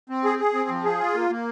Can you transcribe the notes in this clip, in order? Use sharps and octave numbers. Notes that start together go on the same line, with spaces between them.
C4
G#4
G#4
C4
F3
G#4
F4
A#3
A#3